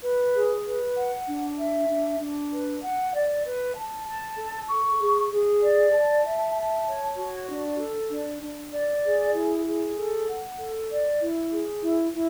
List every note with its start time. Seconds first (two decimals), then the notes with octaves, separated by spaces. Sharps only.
0.03 B4
0.34 G#4
0.65 B4
0.96 F#5
1.27 D4
1.58 E5
1.89 D4
2.20 D4
2.51 B4
2.83 F#5
3.13 D5
3.45 B4
3.75 A5
4.07 A5
4.38 A4
4.69 C#6
5.00 G#4
5.31 G#4
5.61 D5
5.92 A5
6.24 E5
6.55 A5
6.86 C#5
7.17 F#4
7.48 D4
7.79 A4
8.10 D4
8.41 D4
8.72 D5
9.03 G#4
9.34 E4
9.65 G#4
9.96 A4
10.27 F#5
10.58 A4
10.89 D5
11.20 E4
11.52 G#4
11.82 E4
12.13 E4